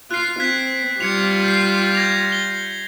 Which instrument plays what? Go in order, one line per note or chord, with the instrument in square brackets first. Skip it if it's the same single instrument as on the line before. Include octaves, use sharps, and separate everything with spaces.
[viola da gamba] F4 [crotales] F#6 C7
[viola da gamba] C4 [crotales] F#6 G#6 B6
[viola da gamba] G3 F4 [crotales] G#6 C#7 F7
[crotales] G6 C7
G#6 A#6 F7
G7